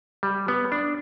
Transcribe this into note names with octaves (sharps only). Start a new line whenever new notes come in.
G3
B3
D4